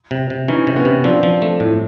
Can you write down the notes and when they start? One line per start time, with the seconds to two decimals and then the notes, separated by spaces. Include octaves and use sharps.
0.11 C3
0.30 C3
0.48 E3 C#4 D#4
0.67 C3
0.76 B3 C#4
0.85 C3
1.04 F3 C4 D4
1.23 F3
1.42 A3
1.60 A2